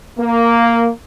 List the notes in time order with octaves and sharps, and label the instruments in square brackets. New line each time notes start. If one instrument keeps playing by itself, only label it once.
[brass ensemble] A#3